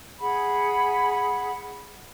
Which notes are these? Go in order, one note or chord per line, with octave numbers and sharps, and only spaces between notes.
G#4 F#5 B5